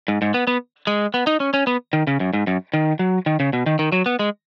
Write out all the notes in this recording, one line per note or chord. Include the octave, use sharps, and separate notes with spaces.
G#2
G#2
B3
B3
G#3
B3
D#4
C#4
C#4
B3
D#3
C#3
F#2
G#2
F#2
D#3
F#3
D#3
C#3
B2
D#3
D#3
F#3
B3
G#3